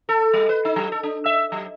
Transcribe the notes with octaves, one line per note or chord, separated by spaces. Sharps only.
A4
G3
B4
D#4
F#3
A4
D4
E5
F#3